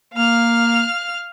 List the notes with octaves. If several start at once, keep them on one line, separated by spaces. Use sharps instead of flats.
A#3 F5 F6